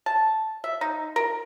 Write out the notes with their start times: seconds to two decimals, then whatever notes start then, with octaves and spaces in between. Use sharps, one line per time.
0.06 A5
0.64 E5
0.81 D#4
1.16 A#4